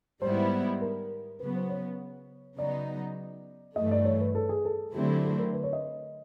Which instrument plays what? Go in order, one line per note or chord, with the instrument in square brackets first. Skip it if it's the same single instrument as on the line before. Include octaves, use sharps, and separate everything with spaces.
[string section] G#2 D#3 G3 B3 E4 [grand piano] C5
[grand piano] A#4
[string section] C#3 F#3 B3 [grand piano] B4
[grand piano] C5
C#5
[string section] C#3 F#3 B3 D#4 [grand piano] D5
[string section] G2 E3 A3 [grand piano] D#5
[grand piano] D5
C#5
B4
A4
G#4
A4
[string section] D3 F#3 A3 C4 E4 [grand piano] G4
[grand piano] A4
A#4
B4
C#5
D#5